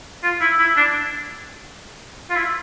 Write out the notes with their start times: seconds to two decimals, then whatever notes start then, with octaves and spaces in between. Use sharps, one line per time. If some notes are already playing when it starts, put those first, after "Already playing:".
0.23 F4
0.41 E4
0.59 E4
0.76 D4
2.30 F4
2.35 E4